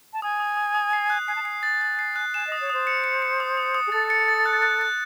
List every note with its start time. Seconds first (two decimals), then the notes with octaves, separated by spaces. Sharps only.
0.13 A5
0.22 G#5 D#6
0.40 D#6
0.57 D#6
0.75 D#6
0.93 C7
1.10 F#6
1.28 G#5 C7
1.36 A5
1.43 G#5 C7
1.63 A6
1.81 A6
1.99 C7
2.16 F#6
2.34 G#5 E7
2.47 D#5 D#6
2.61 C#5
2.70 C5 D#6
2.87 C#7
3.04 C#7
3.22 C#7
3.40 D#6
3.57 D#6
3.75 D#6
3.87 G#4
3.92 A4 A6
4.10 C#7
4.28 A6
4.46 F#6
4.62 F#6
4.81 F#6